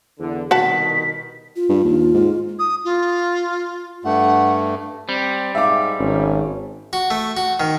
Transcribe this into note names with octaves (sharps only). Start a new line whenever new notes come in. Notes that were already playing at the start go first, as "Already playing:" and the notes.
E2 D3
C2 B2 D#3 F#4 F#5 A5 B6
F4
G2
D#2
G#2
D#6
F4
G2 A3 F#5
G3 C4
G#2 E5 F5 D6
G#1 C#4
F#4
A3
F#4
D#3